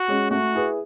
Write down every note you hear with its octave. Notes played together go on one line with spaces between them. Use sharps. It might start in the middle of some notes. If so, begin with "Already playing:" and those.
Already playing: F#4
G#3 C#4
A3 F#4
E4 G#4 B4